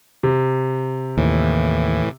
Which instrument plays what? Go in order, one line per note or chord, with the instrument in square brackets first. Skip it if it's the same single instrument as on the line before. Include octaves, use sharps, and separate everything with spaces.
[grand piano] C3
[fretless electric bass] D#2 [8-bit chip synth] A2 E3